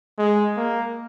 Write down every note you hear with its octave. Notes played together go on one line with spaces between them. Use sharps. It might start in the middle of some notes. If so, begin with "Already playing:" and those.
G#3
A#3